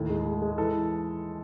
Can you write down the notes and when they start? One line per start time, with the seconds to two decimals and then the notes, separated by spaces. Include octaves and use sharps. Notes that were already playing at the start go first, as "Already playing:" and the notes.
Already playing: D#2 A2
0.10 G#3
0.26 G#3
0.42 G#3
0.58 E3 A4